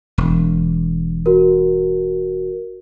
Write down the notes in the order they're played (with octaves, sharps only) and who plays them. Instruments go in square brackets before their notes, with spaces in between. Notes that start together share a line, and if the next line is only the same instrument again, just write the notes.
[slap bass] E1
[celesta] F#4 A#4